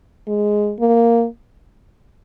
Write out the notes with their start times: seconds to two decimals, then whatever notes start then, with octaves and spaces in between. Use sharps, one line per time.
0.28 G#3
0.80 A#3